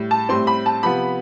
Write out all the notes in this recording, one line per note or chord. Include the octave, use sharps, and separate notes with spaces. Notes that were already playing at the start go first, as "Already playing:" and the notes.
Already playing: A2 G3
A5
A2 G3 C4 C6
B5
A5
C3 F3 B3 B5